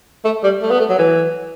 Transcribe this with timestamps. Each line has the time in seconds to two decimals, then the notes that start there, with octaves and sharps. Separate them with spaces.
0.25 A3
0.43 G3
0.62 A3
0.71 B3
0.80 A3
0.90 F#3
0.99 E3